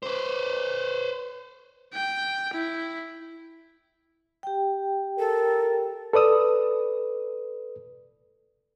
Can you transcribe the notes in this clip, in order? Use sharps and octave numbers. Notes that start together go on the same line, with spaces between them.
B4 C5
G5
E4
G4 G5
A4 A#4
A4 B4 D5 D#6 E6